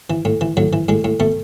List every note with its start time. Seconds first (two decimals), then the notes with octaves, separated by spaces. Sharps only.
0.10 E3
0.25 A2
0.41 E3
0.57 A2 F#3
0.73 E3
0.89 A2 G#3
1.04 A2
1.20 B2 A3